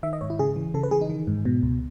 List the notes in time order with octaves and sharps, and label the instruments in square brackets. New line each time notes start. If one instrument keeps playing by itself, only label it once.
[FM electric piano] D#3 E5
D#5
G#2 C#5
E4
C#3 G#4
E3
C#3 A4
B4
E3 G#4
D#4
D#3
G#2
B2
C#2